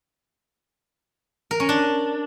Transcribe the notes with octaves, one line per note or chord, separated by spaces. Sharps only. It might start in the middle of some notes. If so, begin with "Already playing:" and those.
A#4
C#4
D4